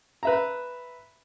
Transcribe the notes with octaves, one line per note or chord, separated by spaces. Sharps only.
B4 E5 A#5